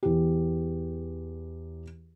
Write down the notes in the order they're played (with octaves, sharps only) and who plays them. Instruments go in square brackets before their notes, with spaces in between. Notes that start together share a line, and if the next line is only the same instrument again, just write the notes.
[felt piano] E2 G4